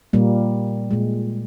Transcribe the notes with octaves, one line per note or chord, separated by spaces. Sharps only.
A#2 G3 A#3
A#2 G#3